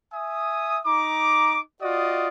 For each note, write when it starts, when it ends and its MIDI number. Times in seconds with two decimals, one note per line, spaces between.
0.13 0.79 76
0.13 0.79 80
0.13 0.79 87
0.86 1.59 63
0.86 1.59 82
0.86 1.59 86
1.82 2.28 65
1.82 2.28 66
1.82 2.28 74
1.82 2.28 75
1.82 2.28 87